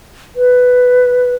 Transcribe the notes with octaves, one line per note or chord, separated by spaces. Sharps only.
B4